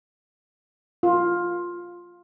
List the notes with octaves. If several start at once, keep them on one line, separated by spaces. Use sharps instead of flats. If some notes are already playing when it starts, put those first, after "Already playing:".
F4